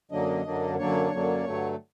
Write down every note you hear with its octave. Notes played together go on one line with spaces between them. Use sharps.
F#2 D3 F#3 A#3 D4 D#5
F#2 D3 F#3 A#3 D4
F#2 D3 F#3 A#3 D4 C#5
F#2 D3 F#3 A#3 D4
G2 D3 F#3 A3